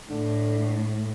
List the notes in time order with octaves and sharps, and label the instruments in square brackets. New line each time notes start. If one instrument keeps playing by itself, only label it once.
[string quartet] A2 [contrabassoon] D3